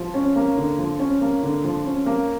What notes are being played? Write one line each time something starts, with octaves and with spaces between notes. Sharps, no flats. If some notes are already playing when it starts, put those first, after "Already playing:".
Already playing: F3
C#4
A#3
D3
F3
C#4
A#3
D3
F3
C#4
A#3